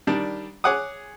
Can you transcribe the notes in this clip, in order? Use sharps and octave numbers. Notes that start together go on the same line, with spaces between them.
D#3 G3 D4
G#4 C#5 F#5 D6 D#6